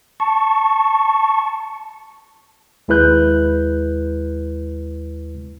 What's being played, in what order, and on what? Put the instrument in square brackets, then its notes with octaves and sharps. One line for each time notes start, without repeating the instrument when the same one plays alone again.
[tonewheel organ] A5 C#6
[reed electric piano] D#2 G#3 E4 B4 F#6 G6